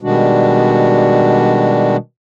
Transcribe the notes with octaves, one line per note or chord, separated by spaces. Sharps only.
B2 D#3 G3 G#3 D4 F#4